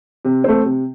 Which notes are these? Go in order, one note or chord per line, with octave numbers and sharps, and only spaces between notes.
C3
A3 C4
C3